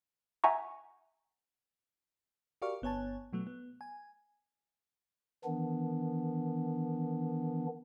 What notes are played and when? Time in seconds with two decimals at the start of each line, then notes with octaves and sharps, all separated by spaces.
0.44 E5 F#5 G#5 A#5 C#6
2.62 F#4 G4 A#4 D5 F5 C#6
2.82 G1 B3 C#5 G#5 A5
3.33 B2 F#3 A3 B3
3.47 B3
3.81 G#5
5.45 D#3 E3 B3 D4